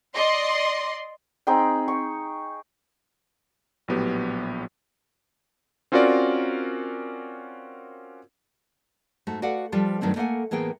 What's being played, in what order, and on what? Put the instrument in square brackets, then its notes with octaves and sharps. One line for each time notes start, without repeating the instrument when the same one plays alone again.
[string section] D5 D#5 C6
[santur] C4 D#4 G#4 G5
C#6
[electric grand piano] A#1 A2 F#3 B3 G4
C4 C#4 F4 F#4 A#4 D5
[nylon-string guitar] G#2 A3 F#4
F#4 A4 B4 D5 F5 F#5
F3 G3 F4 A4 B4 C5
G2 D#3 F#3 A3 C4
A3 A#3 A4 C5 F#5 G#5
A2 E3 A#3 B3 G#4 G5